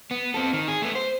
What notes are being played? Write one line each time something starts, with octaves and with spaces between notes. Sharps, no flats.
B3
C4 A4
D#3
G#4
A3 B3
C5